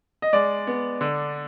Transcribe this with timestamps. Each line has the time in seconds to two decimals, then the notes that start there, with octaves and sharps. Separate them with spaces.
0.22 D#5
0.33 G#3 D5
0.67 B3
1.01 D3